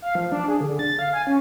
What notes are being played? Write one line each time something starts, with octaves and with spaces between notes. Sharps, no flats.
F5
F3
D4
G#4
D3
A6
F5
G#5
C#4